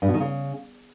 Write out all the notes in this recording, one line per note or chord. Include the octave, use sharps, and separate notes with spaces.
G2
B2
D#3
C#3